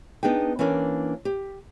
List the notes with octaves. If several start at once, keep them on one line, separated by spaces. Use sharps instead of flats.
B3 D4 D#4 G#4 G5
E3 A#3 C#4 D4 A#4
G4